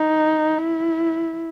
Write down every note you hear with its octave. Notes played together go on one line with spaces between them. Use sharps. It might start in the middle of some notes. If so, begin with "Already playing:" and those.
Already playing: D#4
E4